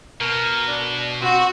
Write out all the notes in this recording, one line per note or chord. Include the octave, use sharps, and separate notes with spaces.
B2 A#4
D4
C4 F#4